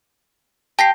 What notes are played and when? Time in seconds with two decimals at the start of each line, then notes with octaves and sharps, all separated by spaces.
0.79 G4 A5 A#6 C7